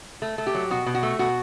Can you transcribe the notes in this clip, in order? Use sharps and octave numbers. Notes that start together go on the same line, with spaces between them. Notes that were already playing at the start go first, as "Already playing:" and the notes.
A3
A3
G4
F#3
B2 F#4
B2
F#4
A3
B2 F#4